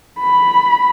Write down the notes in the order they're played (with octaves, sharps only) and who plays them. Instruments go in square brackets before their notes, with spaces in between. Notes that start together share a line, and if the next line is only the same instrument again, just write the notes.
[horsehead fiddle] B5